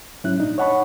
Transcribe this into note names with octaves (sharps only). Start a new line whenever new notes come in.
G#2 F#3 C#4 E4 E5 F#6
F#2 A#2 D4 D#4
C#5 D#5 F#5 A5 B5 C#6